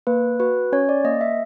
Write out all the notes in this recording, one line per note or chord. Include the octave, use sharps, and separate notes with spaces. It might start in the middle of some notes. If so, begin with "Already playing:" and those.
A#3 B4
F#4 B4
C#4 C#5
D5
A#3 D#5
E5